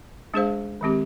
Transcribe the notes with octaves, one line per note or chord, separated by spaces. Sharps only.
G#3 D4 G#4 C5 F5
D#3 G#3 C4 G4